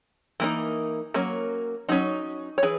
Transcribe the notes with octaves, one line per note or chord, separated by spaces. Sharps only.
E3 A#3 D#4
F#3 A#3 C#4
F#3 C#4 D#4
C#5
E3 G#4 B4